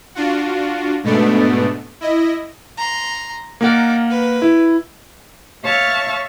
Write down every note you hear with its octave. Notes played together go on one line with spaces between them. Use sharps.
D4 F4 F#4
G#2 B2 A3 B3 D4
E4 D#5
A#5 C6
A#3 D#4 A#4 D5 F#5
B4
E4
C#5 E5 F5 A5 C#6